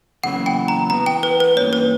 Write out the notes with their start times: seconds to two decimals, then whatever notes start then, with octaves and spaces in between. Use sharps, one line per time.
0.23 E2 C#3 F#3 A#3 E4 F#5
0.46 G5
0.68 A#5
0.90 E3 B3 F#4 A#5
1.06 G5
1.23 B4
1.40 B4
1.57 G2 E3 A#3 C#4 C#5
1.73 B4